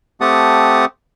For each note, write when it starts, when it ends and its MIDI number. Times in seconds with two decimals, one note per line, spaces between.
0.21 0.85 57
0.21 0.85 60
0.21 0.85 67
0.21 0.85 78
0.21 0.85 81
0.21 0.85 87